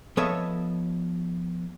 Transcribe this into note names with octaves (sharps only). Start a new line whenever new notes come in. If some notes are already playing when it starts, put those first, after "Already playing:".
F3 B3 A4 C#5 D#5 E5